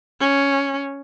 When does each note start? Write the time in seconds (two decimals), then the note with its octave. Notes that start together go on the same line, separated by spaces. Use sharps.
0.20 C#4